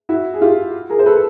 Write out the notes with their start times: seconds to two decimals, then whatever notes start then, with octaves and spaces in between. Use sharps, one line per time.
0.09 E4 F#4
0.34 G#4
0.41 F4 G4
0.90 G#4 A#4
0.99 C5
1.06 A4 B4